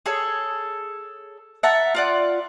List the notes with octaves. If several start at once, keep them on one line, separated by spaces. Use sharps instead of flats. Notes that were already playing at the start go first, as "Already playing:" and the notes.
G#4 A4 C#5
E5 F#5 A5 A#5
F4 D5 F#5